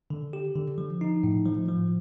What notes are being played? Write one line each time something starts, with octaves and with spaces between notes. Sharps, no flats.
D3
G4
D3
F3
D#4
A2
F3
F3